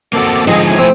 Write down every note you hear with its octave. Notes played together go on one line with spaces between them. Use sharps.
A#3 C4 F#4 A4 D6
D3 F3 G#3 C4 D#4 F4 G#4 D#5
A2 C3 G#5
F3 A3 C4